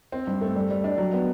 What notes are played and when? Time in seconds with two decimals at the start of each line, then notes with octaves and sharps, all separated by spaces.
0.12 C4
0.27 G2
0.41 A3
0.56 G3
0.70 G3
0.84 D4
0.98 F#3
1.13 B3